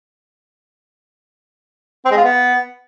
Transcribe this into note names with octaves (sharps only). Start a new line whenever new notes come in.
C4
G#3
F4
B3